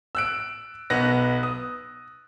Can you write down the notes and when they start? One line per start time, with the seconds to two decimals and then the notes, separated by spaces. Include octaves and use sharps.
0.15 E6 F#6 D7
0.90 B1 B3 F#6 A#6
1.43 D#6